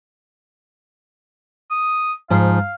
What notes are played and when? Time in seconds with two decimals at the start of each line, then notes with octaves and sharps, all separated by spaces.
1.70 D#6
2.30 G#2 F3 F5